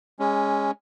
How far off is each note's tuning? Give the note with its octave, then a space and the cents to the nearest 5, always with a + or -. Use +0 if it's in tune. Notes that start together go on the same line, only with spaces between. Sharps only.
G#3 -15 C#4 +0